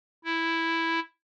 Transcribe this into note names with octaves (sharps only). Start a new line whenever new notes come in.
E4